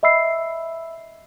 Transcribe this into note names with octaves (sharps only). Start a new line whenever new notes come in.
D#5 E5 B5 E6 C7